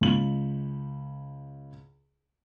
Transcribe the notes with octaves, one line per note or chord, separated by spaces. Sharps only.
C#2 F#7